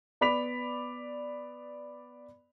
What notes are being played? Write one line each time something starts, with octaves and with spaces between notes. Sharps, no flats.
B3 D5 B5 D6 B6 F7